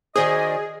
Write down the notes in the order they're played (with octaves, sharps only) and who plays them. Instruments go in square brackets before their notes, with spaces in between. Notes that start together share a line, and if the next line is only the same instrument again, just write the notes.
[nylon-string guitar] D#3 F#4 C5 [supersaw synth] G#4 [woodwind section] D5 D#5